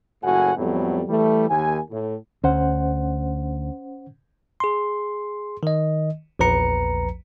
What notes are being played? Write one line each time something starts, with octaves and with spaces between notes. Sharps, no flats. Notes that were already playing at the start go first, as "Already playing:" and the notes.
F#1 A2 F#4 F#5 G#5
F2 A2 F#3 G3 B3
E3 G3 A3
D#2 G#5
A2
D2 C#4 C5 F#5
G#4 C6
D#3 D#5
A#1 E2 F3 B4 A#5 C#7